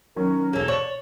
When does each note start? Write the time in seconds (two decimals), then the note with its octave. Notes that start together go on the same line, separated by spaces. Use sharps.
0.16 D#3 F#3 C#4 A#4
0.53 E1 A#3 G#4 A4 C#5
0.68 C#5 D5 E7 F#7